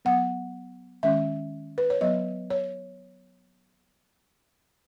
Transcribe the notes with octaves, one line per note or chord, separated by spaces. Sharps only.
F#3 B3 F#5
D#3 G#3 C#4 E5
B4
C#5
F#3 B3 D#5
C#5